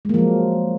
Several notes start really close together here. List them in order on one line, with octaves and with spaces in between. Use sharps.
G#3 A#3 F3 F#3